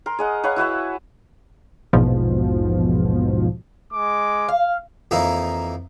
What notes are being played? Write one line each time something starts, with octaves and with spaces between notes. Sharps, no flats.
A#4 C6
G#4 D#5 F#5
B4 C#5 F5 F#5
E4 F#4 B4 E5
A#1 E2 G#2 B2 F3
G#3 D6
F5
F2 E3 A#3 D#4 E4